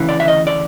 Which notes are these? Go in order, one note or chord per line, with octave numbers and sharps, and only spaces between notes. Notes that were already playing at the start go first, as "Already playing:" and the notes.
Already playing: D2 C#3 E3
D5
E5
D#5
D5